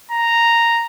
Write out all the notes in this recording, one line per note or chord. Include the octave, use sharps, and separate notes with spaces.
A#5